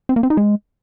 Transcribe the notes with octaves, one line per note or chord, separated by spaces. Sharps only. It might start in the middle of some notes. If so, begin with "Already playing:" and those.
C4
A#3
C4
D#4
G#3